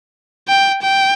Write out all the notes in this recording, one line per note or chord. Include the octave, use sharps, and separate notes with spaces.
G5
G5